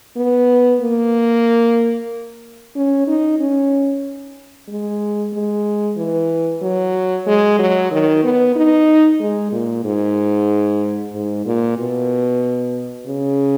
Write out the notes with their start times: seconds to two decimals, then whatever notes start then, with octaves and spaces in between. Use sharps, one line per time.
0.17 B3
0.81 A#3
2.75 C#4
3.07 D#4
3.39 C#4
4.68 G#3
5.33 G#3
5.97 E3
6.62 F#3
7.26 G#3
7.59 F#3
7.91 D#3
8.24 B3
8.56 D#4
9.20 G#3
9.52 A#2
9.85 G#2
11.14 G#2
11.46 A#2
11.78 B2
13.07 C#3